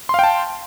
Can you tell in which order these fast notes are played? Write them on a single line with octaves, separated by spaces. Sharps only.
C6 F5 G5 A5